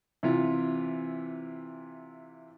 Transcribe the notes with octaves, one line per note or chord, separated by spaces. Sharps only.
C3 E3 F4